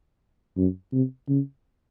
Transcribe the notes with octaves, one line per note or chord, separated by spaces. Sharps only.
F#2
C3
C#3